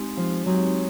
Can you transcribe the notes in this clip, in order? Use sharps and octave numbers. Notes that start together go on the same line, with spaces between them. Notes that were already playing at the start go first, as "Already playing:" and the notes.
Already playing: G#3 C4 D#4 G4
F3
F#3 G#3 C4 D#4 G4